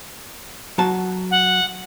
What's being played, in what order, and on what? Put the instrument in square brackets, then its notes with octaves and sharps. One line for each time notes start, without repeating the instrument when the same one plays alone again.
[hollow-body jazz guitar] F#3 F#4 A5
[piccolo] F#5